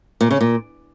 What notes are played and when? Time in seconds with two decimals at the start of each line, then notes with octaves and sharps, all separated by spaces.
0.21 A#2
0.31 C#3
0.41 A#2